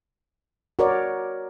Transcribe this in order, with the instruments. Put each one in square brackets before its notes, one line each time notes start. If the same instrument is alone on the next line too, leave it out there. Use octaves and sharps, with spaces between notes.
[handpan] F#4 A#4 C#5 D5